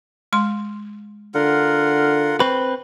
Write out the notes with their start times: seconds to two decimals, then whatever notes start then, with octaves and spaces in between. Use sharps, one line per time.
0.33 G#3 C6
1.34 D3 F4 A#4 F#5
2.40 C4 B4 C#6